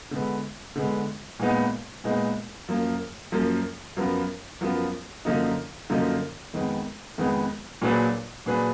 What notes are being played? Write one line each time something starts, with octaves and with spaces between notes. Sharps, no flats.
D3 G#3 B3
D3 G#3 B3
A#2 G#3 B3 D#4
A#2 G#3 B3 D#4
F#2 F3 A#3
F#2 F3 A#3
F#2 F3 B3 F4 A#4
F#2 F3 B3 F4 A#4
F#2 D3 F3 A#3 D#4
F#2 D3 F3 A#3 D#4
F2 D#3 G#3 B3
F2 D#3 G#3 B3
A#2 F#3 D4 G#4 B4
A#2 F#3 D4 G#4 B4